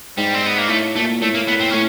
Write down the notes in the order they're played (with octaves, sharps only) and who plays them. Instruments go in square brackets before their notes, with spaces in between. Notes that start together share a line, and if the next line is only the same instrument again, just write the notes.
[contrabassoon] G#2 [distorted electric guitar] G3
[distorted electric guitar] C4
B3
A#3
[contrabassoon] A2 [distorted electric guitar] A3
[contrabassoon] A#2 [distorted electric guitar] A3
[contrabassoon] A2 [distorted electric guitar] A3
[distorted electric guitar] A#3
B3
C4
[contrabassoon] A2 [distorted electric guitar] C#4